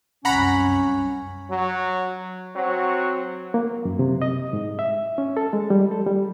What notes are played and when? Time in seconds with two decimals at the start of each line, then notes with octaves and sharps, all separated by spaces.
0.25 C2 F#2 C#4 F#5 A#5 B5
1.50 F#3
2.55 F#3 C4 F#4
3.54 A#3
3.85 F#2
3.99 C3
4.22 D#5
4.53 G#2
4.79 E5
5.18 C#4
5.37 A4
5.53 G#3
5.70 G3
5.91 A4
6.06 G3